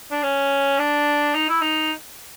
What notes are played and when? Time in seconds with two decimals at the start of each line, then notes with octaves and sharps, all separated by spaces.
0.11 D4
0.23 C#4
0.79 D4
1.35 D#4
1.49 E4
1.62 D#4